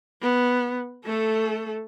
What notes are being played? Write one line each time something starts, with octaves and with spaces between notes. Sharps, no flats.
B3
A3 A4